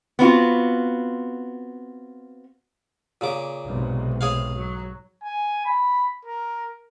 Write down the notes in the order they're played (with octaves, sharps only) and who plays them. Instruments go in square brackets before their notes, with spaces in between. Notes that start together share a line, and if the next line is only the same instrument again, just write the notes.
[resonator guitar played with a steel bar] B3 C4 F4 F#4
[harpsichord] A#2 C#3 D6
[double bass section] B1 G#2 C3
[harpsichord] G#4 C#5 F5
[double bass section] F#3
[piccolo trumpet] G#5
B5
A#4